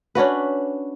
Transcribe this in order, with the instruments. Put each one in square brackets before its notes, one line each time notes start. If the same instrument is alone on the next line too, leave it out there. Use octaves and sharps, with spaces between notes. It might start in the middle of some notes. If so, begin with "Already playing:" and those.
[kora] C#4 D4 F#4 B4